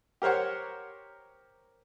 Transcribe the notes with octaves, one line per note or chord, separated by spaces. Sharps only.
G4 A#4 C5 C#5 F#5